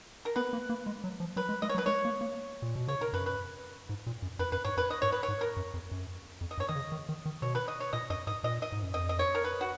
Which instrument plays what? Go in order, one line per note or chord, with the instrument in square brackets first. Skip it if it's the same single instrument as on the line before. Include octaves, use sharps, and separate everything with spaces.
[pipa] A#4
[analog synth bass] B3 [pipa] B4
[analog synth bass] A#3
A#3
G#3
F#3
F3
[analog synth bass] F#3 [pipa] B4
[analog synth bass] G#3
[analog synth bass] G#3 [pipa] D#5
[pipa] C#5
[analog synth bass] F#3
[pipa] B4
[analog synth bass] G#3 [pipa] C#5
[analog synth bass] A#3
A#3
A#2
B2
[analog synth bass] C#3 [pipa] C#5
[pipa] A#4
[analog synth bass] F#2 [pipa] B4
[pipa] B4
[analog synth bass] G#2
A#2
F#2
[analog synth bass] F2 [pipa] B4
[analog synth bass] F#2 [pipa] B4
[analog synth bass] G#2 [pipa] C#5
[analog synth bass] F2 [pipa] B4
[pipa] D#5
[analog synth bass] G#2 [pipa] C#5
[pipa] B4
C#5
[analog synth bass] G#2
[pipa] A#4
[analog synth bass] F#2
F2
F#2
F2
[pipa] D#5
[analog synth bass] F#2 [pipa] C#5
[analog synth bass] D#3 [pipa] D#5
[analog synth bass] C#3
D#3
D#3
D#3
[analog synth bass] B2 [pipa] C#5
[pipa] B4
D#5
C#5
[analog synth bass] A#2 [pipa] D#5
[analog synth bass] F#2 [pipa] D#5
[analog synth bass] G#2 [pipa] D#5
[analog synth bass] A#2 [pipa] D#5
[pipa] D#5
[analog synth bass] G#2
F#2
[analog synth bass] F2 [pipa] D#5
[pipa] D#5
C#5
A#4
B4
F#4